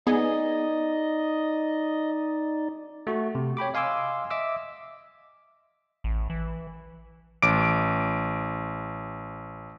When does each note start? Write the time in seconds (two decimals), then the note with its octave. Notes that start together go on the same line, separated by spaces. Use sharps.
0.07 B3 D#4 G#4 D5 D#5
3.07 A3 F#4
3.35 C3
3.57 C#5 G5 B5 D6
3.74 D#5 F5 G#5 C6 D6 E6
4.30 D#5 E5 D6 E6
6.04 A1
6.30 E3
7.42 A1 D6 D7